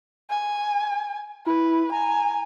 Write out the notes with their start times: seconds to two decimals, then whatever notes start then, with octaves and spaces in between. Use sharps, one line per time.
0.30 G#5
1.46 E4 B4
1.92 G#5 A#5